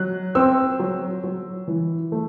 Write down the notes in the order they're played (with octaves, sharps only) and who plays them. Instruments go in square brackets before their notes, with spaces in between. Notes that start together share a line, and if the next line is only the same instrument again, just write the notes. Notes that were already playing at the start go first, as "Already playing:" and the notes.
Already playing: [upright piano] F#3 F#6
C4 E6
F#3
F#3
E3
A3